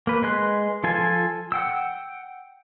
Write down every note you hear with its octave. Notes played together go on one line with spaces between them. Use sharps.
A#3 B4
G#3 B4 C6 F#6
F3 F4 A4 G#5
F#5 G5 E6